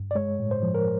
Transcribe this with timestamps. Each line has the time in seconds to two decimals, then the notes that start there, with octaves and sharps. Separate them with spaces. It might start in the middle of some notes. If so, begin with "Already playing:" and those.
Already playing: G2
0.11 D5
0.15 G#3 C#5
0.40 A2
0.51 C5
0.63 F3
0.75 A#4